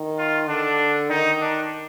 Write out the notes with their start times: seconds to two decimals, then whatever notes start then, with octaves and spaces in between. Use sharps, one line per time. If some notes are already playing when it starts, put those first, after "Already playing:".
Already playing: D#3
0.18 F4
0.48 D3 D4
1.10 D#3 D#4
1.41 D4